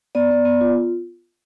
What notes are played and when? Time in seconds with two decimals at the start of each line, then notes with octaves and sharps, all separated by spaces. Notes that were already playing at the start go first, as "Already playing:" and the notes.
0.15 B3 D5
0.30 B3
0.45 B3
0.61 F4